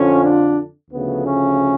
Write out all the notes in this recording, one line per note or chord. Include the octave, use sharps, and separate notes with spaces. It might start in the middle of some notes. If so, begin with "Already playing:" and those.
Already playing: F2 D3 F3 C#4
D4
D2 C#3 F3 A3 B3
C#4